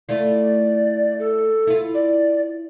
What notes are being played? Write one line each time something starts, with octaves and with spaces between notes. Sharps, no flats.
A3 E4 F4 D5
A4
E4 F4
D5